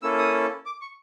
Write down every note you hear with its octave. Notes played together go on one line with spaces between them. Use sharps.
A#3 C#4 E4 A4 E6
D#6
D6
C#6